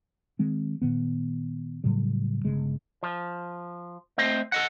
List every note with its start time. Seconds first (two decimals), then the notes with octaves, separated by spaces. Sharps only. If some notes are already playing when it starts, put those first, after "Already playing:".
0.39 D#3 G#3 C4
0.82 A#2 D#3 B3
1.84 A2 C#3 F#3 G3
2.45 G1 C#3 G#3
3.03 F3
4.18 A3 C4 C5 D#5
4.52 A4 D#5 F#5